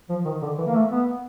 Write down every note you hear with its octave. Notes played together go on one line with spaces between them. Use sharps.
F3
D#3
D3
E3
A#3
A3
B3